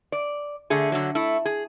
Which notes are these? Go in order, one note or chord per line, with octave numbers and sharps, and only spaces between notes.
D5
D3 A3 G#4
D3 F#3
A3 E4
G#4